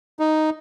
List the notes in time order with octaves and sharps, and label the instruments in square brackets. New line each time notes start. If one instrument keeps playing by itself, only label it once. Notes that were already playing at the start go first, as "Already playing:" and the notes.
[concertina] D#4